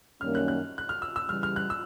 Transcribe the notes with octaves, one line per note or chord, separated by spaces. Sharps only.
F#2 D#3 G3 A#3 C#4 F6
F#6
F#6
F#6
F6
E6
E6
C#3 E3 G3 F6
F6
F#6
E6